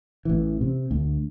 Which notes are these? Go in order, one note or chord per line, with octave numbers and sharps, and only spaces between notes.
A1 E3
C3
D2